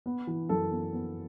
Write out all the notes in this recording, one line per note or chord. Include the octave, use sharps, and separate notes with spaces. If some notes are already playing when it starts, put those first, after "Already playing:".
B3
E3
F#2 A4
B3
B3